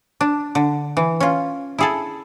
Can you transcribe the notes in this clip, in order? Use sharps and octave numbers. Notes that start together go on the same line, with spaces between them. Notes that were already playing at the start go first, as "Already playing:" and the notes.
D4
D3
E3
C#4 F4
E4 G#4 A4